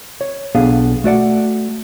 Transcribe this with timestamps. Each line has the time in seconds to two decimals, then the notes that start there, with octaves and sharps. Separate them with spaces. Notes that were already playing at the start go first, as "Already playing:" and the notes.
0.21 C#5
0.55 B1 B3 D4 G#4 F5
1.04 A3 F#4 D5 F#5